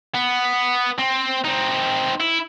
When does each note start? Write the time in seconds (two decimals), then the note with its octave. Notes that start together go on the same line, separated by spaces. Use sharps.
0.15 B3
0.98 C4
1.45 C4 D#4
2.20 E4